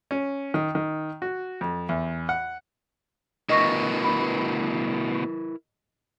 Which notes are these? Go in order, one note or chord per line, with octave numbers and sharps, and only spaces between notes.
C#4
D#3
D#3
F#4
F2
E2
F#5
D2 B2 E4 A#4 B4 D#5 C#6 A#6
B5